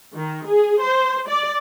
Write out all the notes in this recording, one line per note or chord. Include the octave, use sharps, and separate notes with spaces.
D#3
G#4
C5
D5